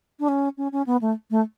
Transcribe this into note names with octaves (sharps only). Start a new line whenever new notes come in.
D4
C#4
C#4
C#4
B3
A3
A3